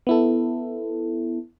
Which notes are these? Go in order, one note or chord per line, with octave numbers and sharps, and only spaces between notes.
B3 E4 A4